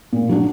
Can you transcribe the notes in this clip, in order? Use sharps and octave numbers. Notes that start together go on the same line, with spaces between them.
A#2
F#3 D4 F#4